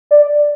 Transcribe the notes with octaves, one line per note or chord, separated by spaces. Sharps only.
D5